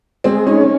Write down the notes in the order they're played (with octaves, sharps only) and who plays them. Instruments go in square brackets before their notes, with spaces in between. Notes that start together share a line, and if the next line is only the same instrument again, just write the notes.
[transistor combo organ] G#3 [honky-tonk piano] C4
[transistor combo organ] C#4 [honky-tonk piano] D#4